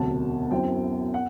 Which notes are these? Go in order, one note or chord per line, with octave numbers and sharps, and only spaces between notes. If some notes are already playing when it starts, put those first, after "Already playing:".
Already playing: E1 D2 C3 F#3 A5
F#2 F#3 C4 E4 G5
F#5